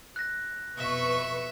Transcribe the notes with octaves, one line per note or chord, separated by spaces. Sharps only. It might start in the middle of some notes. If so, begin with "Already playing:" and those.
F#6 A#6
F2 B2 B4 E5 C#6